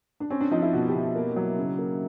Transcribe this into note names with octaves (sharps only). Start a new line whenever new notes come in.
D4
C4 C#4
D4
F3 D#4
E4
B2 F#4
G4
B2
A#3
F#3
C#3
A#3